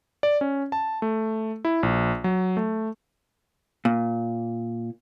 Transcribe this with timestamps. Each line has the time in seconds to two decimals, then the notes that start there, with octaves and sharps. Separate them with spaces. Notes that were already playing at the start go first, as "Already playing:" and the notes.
0.23 D5
0.41 C#4
0.72 A5
1.02 A3
1.65 E4
1.83 A#1
2.24 F#3
2.57 A3
3.85 A#2